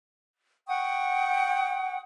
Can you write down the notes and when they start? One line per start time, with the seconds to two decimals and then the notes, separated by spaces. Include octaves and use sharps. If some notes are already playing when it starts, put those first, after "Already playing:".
0.68 F#5 G5 C#6 D#6